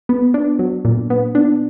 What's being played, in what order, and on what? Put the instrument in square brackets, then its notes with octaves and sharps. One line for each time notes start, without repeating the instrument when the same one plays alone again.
[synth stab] B3
D4
F#3
A#2
B3
D4